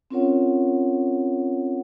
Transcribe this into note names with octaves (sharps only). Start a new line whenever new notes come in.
C4 C#4 F4 A#4 C#5 F#5